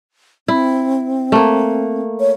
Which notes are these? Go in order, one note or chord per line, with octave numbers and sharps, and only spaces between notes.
C4 E4
A3 A#3
C#5